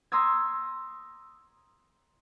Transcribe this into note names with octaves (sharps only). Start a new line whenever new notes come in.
A#5 C6 D#6 E6 G#6